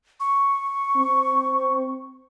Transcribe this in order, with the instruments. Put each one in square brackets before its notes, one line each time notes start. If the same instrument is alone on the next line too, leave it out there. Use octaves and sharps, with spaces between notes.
[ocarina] C#6
[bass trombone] C4